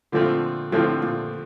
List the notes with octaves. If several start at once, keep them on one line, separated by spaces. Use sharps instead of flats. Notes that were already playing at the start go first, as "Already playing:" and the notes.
A#2 D3 F3 A3 C4 F4
A2 D3 F3 A3 C4 F4
A#2